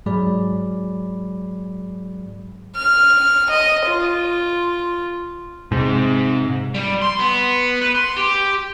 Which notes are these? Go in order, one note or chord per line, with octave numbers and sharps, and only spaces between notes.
G#2 F#3 G#3 G#4 D5 B5
F6
D#5
F4
G#2 C3
G3
C6
B3
B4
C6
G4